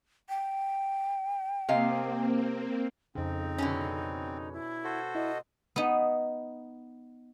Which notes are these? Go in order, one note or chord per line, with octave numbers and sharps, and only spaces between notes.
G5
C3 A#3 C4 D#5 F5
F2 C#3 C4 D#4
B2 D3 C#4
E4
F#4 A4 C5
E4 D#5
B3 D#4